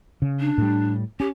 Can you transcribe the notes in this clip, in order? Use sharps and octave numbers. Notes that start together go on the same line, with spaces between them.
C#3
D4
A2 G3
C#4 G4